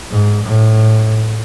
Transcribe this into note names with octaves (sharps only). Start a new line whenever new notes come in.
G#2
A2